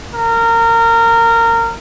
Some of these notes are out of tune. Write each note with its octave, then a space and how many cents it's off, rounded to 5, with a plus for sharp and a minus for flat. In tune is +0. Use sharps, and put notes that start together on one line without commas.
A#4 -20